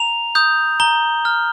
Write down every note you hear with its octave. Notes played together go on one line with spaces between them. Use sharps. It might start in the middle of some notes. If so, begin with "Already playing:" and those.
Already playing: A#5 F7
D#6 G6
A#5 G7
F6